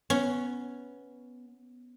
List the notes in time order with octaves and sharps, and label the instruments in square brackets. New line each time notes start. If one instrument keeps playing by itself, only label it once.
[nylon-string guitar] B3 [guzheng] C#4